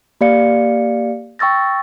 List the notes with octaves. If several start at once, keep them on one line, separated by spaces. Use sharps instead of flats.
A#3 G4 D5 F5 C#7
G5 C#6 E6 A6 A#6